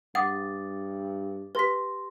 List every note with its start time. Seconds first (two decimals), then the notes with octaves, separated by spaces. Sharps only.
0.15 G2 F#5 D6 D#6 A6
1.55 G4 B4 C6 A#6 B6